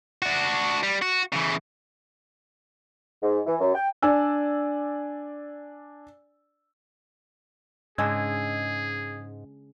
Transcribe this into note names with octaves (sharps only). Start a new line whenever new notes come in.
D4 F#4
G3
F#4
C#3 E3
G#2
E3
F#2
G5
D4 D5 G#5 E6
G#2 C#3 G#3 D4 G#4 D#5 E6 G#6